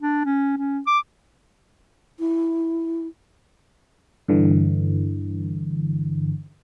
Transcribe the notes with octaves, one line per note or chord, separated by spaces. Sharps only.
D4
C#4
C#4
D6
E4
G2 D3 E3